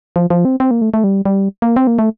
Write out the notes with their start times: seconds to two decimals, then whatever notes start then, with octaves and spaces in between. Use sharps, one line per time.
0.16 F3
0.30 F3
0.45 C4
0.60 C4
0.71 A#3
0.82 A3
0.94 A3
1.04 G3
1.25 G3
1.62 A#3
1.76 C4
1.87 A#3
1.99 A3